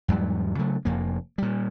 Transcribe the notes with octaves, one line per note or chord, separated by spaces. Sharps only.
E2 G#2 F#3 G3
C#3 F#3 A3
F1 F2 A#3
A#2 G3